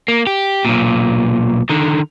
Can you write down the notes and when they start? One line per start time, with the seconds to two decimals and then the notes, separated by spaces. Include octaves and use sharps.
0.08 A#3
0.27 G4
0.65 B1 A#2
1.69 D3 D#3